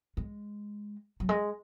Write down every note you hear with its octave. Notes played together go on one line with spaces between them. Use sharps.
G#3
F#3
G#3